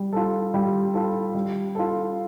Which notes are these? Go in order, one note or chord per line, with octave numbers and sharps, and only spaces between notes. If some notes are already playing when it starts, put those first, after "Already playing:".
Already playing: G3
F4 A4
G3
F4 A4
G3
F4 A4